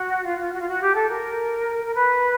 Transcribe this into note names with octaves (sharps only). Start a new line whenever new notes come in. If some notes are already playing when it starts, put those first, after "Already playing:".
Already playing: F#4
F4
F4
F#4
F4
F#4
G4
A4
A#4
A#4
B4